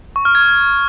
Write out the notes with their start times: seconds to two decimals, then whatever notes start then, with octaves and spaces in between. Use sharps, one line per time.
0.16 C#6
0.25 F6
0.35 G#6